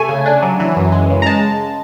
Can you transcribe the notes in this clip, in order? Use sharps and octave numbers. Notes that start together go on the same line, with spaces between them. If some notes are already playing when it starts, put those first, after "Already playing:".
Already playing: C3 A3 G#5
C#3
D4
F#3
E3
F#2
G#3
C#3
A#5
G#3 A5